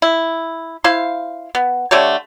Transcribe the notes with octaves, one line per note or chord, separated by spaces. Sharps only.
E4
E4 C5 F5
B3
D3 A3 G4 C#5